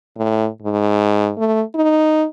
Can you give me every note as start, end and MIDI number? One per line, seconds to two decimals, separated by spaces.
0.17 0.48 45
0.62 1.32 44
1.38 1.62 57
1.75 2.25 63